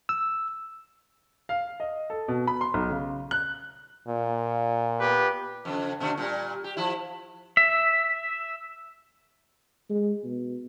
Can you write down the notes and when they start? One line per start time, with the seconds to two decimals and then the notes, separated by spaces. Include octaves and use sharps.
0.09 E6
1.49 F5
1.80 D#5
2.10 A4
2.28 B2
2.47 B5
2.61 C6
2.74 B1
2.90 C#3
3.31 F#6
4.08 A#2
4.99 B3 G4 B4
5.65 F2 C#3
6.00 B2 D3 A3
6.17 A#2 G3
6.64 G4
6.77 F3 E4
7.57 E5
9.90 G#3
10.24 B2